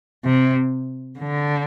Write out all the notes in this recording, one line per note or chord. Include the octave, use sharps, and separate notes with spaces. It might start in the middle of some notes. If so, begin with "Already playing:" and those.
C3
D3